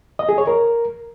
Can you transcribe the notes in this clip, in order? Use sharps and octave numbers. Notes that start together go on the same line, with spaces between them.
D#5
G#4
C#5
A#4